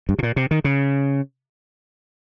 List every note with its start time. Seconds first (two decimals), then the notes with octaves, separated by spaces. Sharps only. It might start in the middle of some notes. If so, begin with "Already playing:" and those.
0.09 G2
0.19 C3
0.23 A#2
0.36 C3
0.51 D#3
0.64 C#3